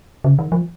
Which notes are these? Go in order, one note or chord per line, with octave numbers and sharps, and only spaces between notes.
C#3
D#3
F3